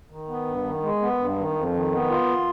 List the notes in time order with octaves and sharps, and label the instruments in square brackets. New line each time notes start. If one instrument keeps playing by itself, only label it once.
[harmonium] D#3
B3
G2
D#3
G#3
B3
G2
D#3
F2
D#3
B3
F4